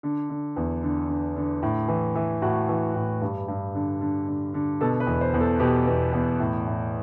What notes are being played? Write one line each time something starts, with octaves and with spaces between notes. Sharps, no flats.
D3
D3
E2
D3
D3
D3
A2
E3
E3
A2 F#4
E3
A2
G2
G2
D3
D3
D3
D3
B2 A4
B4
E2
C5
E2
A4
B2 G4
E2
E2
A2
A2